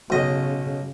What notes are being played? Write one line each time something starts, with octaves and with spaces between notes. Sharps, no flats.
B1 C#3 D#5